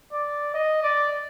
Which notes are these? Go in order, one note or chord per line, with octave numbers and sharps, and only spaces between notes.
D5
D#5
D5